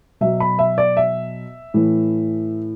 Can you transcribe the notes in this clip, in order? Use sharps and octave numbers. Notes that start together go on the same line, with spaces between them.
B2 F#3 E5
B5
E5
D5
E5
A2 E3